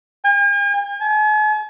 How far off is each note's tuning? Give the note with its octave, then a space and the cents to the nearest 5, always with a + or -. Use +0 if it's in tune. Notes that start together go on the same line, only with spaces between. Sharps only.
G#5 -45
G#5 +45